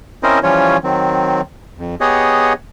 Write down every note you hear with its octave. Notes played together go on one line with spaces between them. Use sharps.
C4 C#4 E4 A#4 C5 D#5
E3 F3 G3 C#4 F4 C#5
D#3 F#3 C4
F2
B3 G4 G#4 C#5 D#5 F#5